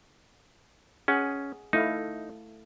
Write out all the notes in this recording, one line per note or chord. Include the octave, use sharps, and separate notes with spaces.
C#4 G#4 F#5
A3 D#4 E4 F5